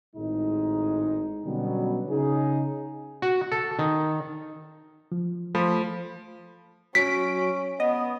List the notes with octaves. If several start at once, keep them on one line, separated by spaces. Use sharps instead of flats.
G#1 A2 G#3 D#4
B2 D3 F#3 G3 B3 C#4
C#3 D#4 G#4
F#4
A4
D#3
F3
F3 A3 A4 B5
F#3 C#4 B6 D7
B3 D#5